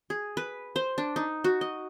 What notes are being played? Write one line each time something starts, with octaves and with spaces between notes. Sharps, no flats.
G#4
B4
C5
D4
D#4
F#4
D#5